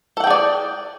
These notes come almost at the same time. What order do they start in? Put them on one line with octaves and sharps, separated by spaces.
A4 F#5 G5 G#4 D5